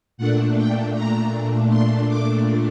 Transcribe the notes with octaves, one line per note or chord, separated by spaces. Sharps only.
A#2 A3 D4 F#5
G5
A#5
C6
D6